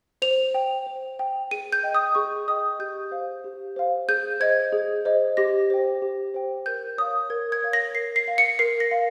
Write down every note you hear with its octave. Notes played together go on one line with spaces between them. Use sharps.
C5 F7
G5
C5
G5
G#4 D#7
G6
D#5 G5
D#6
G#4 C#6
D#5 G5 D#6
G4 G6
C5 F5
G4
C5 F5
G#4 G6
C5 D#5 G#6
G#4
C5 D#5
G4 A#6
C5 G5
G4
C5 G5
A#4 G6
C#5 F5 D#6
A#4 G#6
G#6
C#5 F5
A#6
A#4 C7
C7
F5
C#7
A#4 C7
A#6
F5